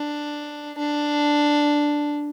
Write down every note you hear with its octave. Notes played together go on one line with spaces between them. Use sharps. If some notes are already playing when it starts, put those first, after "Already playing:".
Already playing: D4
D4